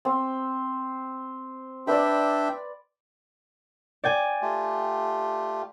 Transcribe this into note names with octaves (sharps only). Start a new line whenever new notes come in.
C4
D4 B4 D5 E5 G5
D5 G5 G#5
A3 F4 G4